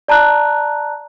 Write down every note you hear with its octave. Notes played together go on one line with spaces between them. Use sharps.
D5 A5 A#5 F#6